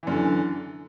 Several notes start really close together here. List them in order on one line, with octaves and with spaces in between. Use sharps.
E3 F#2 D3